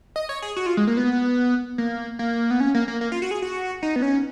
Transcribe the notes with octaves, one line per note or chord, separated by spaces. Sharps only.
D#5
C#5
G#4
F#4
F4
G#3
A#3
B3
A#3
A#3
B3
C#4
A#3
A#3
A#3
F4
F#4
G#4
F#4
D#4
B3
C#4